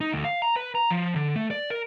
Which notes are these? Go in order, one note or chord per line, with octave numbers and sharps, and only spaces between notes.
D#4
D2
F5
A#5
B4
A#5
F3
D3
A3
D5
A#4